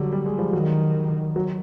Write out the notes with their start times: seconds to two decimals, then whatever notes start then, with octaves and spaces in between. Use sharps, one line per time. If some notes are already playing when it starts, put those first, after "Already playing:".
Already playing: D3 F#3 G3
0.12 G3
0.26 G#3
0.38 F3 G3
0.53 D#3 F#3
1.36 F#3